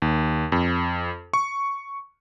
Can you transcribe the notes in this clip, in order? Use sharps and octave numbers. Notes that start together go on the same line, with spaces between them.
D#2
F2
C#6